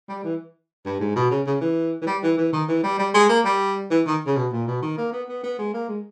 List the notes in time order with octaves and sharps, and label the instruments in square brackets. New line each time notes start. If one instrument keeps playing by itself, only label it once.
[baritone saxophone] G3
E3
G2
G#2
B2
C#3
C#3
E3
E3
G3
E3
E3
D#3
E3
G3
G3
G#3
A#3
G3
E3
D#3
C#3
B2
A#2
B2
D#3
A#3
B3
B3
B3
G#3
A#3
G#3